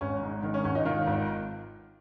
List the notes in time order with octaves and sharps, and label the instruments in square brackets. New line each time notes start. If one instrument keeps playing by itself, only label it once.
[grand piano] G#1 C#4
G#2
D#3
C#4
G#1 C#4
D#4
D#3 F4
G#1